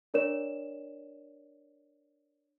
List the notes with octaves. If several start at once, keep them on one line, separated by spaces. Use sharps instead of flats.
D4 A#4 C#5 D5 E7